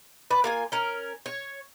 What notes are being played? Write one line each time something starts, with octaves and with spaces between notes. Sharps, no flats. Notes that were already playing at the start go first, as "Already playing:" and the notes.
B4 D5
A#3 F4 G#5
C#4 A#4
C#5